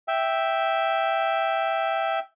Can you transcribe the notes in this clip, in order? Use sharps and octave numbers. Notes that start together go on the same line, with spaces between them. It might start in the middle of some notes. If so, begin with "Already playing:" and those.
E5 G5